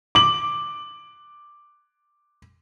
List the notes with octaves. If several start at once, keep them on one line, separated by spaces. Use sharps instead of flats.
D6 F#7